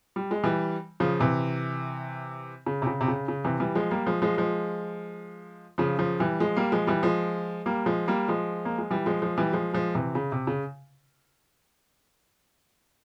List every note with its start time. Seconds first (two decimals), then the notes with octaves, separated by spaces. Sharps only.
0.16 G3
0.31 G#3
0.44 E3 G3
1.00 C#3 F3
1.21 C3 E3
2.66 C#3
2.82 C3
2.87 C#3
3.01 C3
3.08 C#3
3.28 C#3
3.45 C3 E3
3.60 E3 G3
3.75 F3 G#3
3.91 G3 A#3
4.07 F3 G#3
4.22 F3 G#3
4.38 F3 G#3
5.78 C#3 F3
5.99 C#3 F3
6.20 E3 G3
6.40 F3 G#3
6.57 G3 A#3
6.72 F3 G#3
6.87 E3 G3
7.03 F3 G#3
7.66 G3 A#3
7.86 F3 G#3
8.08 G3 A#3
8.28 F3 G#3
8.65 A#3
8.78 G#3
8.91 E3 G3
9.06 F3 G#3
9.22 F3 G#3
9.38 E3 G3
9.53 F3 G#3
9.73 F3 G#3
9.95 C3 E3
10.15 C#3
10.32 C3
10.47 C#3